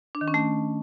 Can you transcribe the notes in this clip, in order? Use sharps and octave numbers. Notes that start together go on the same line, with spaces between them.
D4
D#3
C#4
A3